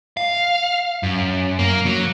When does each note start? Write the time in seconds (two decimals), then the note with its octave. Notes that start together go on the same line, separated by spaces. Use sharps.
0.17 F5
1.03 F#2
1.59 A#3
1.86 F#3